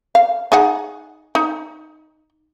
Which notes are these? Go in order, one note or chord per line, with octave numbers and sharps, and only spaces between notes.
F5
D#4 G#4 F#5
D#4